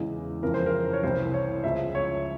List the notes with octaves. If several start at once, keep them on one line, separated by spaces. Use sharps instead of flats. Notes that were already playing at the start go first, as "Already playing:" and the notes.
Already playing: E2 C#3 E3 G#3
F2 C#3 E3 A#4
C5
A#4
C#5
C2 C3 E3 G3 C5
C#5
C#2 C#3 F3 G#3 E5
C#5